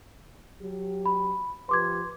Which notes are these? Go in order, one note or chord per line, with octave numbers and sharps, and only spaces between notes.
F#3 G4
B5
F3 G4 B4 C6 D6 G#6